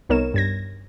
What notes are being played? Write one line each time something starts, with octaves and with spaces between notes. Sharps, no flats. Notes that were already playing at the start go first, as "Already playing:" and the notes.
C2 B3 D#4 A#4 C#5 E7
G2 G#6 A#6